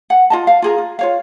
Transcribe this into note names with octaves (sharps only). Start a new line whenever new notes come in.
F#5
F4 D#5 A5
F5
F4 G#4 A#4
F4
F4 C#5 F5